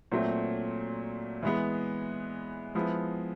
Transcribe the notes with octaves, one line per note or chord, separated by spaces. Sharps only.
A#2 F#3 A3 C4
E3 G#3 B3
F3 G#3 B3 E4